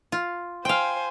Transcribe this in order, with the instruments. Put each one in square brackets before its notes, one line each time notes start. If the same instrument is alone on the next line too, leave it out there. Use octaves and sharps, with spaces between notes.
[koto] F4
[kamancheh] C5 G#5 [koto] F5 G5